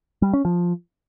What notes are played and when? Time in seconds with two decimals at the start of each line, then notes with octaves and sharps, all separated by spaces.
0.22 G3
0.33 C#4
0.45 F3